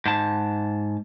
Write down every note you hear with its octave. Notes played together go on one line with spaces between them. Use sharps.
G#2 A5